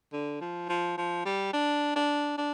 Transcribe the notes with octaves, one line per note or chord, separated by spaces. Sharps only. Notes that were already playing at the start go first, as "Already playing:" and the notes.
D3
F3
F3
F3
G3
D4
D4
D4